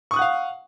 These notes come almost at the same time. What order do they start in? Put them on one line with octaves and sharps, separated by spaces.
C#6 D#6 F#6 F#5 F5